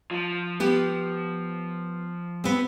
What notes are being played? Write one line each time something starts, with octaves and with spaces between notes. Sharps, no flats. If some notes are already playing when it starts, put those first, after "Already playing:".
F3
B3 G4
B3 C4